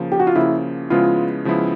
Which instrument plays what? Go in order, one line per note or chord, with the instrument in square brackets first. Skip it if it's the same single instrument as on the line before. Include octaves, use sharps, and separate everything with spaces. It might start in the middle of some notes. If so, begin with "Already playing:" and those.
Already playing: [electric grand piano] C#3 F3 A#3
[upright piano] G4
F#4
F4
[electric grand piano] C#3 F3 A#3 [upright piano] E4
[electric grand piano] C#3 F3 G#3 B3 E4 [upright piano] F4
[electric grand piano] C#3 F3 G#3 B3 E4